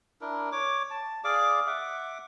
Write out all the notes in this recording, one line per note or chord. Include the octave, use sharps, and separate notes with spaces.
D4 E4 A#4
C#5 D6
A5
G#4 D5 F5 D6
E5 F#5 D6